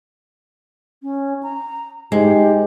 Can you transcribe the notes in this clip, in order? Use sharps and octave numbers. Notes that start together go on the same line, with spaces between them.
C#4
A#5
G#2 G#3 G4